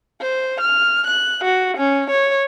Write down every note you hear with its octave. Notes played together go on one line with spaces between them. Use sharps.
C5
F6
F#6
F#4
C#4
C#5